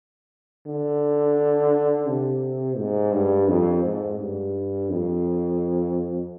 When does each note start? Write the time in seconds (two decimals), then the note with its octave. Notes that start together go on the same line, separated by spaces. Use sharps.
0.66 D3
2.08 C3
2.78 G#2
3.13 G2
3.48 F2
3.84 G#2
4.19 G2
4.90 F2